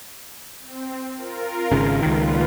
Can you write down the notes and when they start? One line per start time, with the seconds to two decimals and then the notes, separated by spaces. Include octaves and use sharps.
0.61 C4
1.16 F4 A#4
1.72 G#1 C#3
2.02 C#2 A#2 D#3 F4 B4